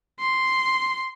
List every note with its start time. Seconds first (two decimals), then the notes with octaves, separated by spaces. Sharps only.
0.19 C6